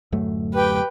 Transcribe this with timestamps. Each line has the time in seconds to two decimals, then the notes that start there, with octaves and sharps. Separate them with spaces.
0.12 D1 F#2 A3
0.54 G4 B4 G5